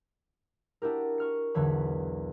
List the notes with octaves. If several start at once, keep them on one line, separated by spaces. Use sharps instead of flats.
D4 E4 F#4 G4 A#4
C#6 F6 C#7
B1 E2 D3 E3 C#5 B5